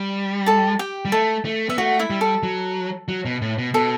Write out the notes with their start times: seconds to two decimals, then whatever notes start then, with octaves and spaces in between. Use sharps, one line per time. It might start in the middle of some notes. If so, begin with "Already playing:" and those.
Already playing: G3
0.46 A4 A5
0.79 G4 G5
1.05 G3
1.12 A3 A4 A5
1.45 A3
1.69 B3 E5
1.78 A3 F#4 F#5
1.99 E4 E5
2.10 G3
2.21 A4
2.43 F#3
3.08 F#3
3.25 B2
3.41 A2
3.58 B2
3.74 B2 A4